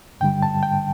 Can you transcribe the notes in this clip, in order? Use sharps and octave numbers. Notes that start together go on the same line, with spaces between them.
G2 D3 G3 G5
A5
G5